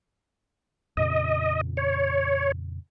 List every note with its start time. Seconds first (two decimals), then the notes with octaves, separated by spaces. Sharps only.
0.97 F2 A#2 C#3 D#5
1.77 C#5